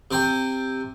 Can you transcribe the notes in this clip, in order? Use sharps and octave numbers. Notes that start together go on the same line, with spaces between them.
C3 C5 G5